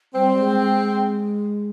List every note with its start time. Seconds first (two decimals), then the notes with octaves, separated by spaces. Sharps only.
0.15 G3 C4
0.37 G#3
0.59 G#3